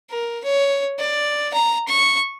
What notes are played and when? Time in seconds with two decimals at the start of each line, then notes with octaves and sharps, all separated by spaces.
0.11 A#4
0.44 C#5
0.99 D5
1.54 A#5
1.88 C#6